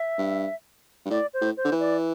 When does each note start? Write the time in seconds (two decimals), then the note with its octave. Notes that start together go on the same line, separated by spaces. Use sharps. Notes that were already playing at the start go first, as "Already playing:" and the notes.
Already playing: E5
0.18 G2
1.06 G2
1.10 A2 D5
1.34 C5
1.42 A2
1.57 C5
1.65 D3
1.72 E3
1.80 D5